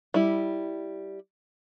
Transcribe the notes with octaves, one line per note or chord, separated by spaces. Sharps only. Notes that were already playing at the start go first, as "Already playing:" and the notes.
G3 E4